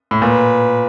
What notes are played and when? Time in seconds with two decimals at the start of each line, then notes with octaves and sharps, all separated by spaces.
0.11 A2
0.22 A#2 B4